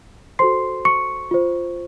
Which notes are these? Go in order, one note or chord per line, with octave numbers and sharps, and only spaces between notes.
F#4 A4 C5 C6 C7
C#6 C#7
F4 C5